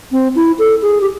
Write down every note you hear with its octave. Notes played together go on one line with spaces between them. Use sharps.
C4
E4
A4
G#4
G4